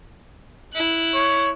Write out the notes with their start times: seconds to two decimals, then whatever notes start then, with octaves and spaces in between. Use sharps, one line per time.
0.73 E4 F#6
1.14 C#5